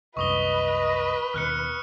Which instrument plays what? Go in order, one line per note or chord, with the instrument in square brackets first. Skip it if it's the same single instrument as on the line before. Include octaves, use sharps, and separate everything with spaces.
[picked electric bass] C2 F#2 [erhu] B4 [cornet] D#5 [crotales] C#6 D#6 G7
[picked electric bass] D#2 B2 [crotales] F6 F#6 C#7